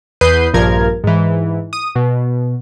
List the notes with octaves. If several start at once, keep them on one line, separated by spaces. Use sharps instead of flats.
E2 B4 D#6 G6 C7 D#7
A#1 G2 F3 A#4 G#6
G#2 E3
D#6
B2